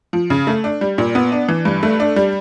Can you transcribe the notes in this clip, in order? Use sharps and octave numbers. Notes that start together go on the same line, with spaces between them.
F3
C#3
A3
D4
G3
A#2
B3
D4
E3
G2
A3
D4
G3